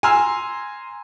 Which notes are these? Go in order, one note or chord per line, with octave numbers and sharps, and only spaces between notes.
G#5 A#5 C6 E6 F6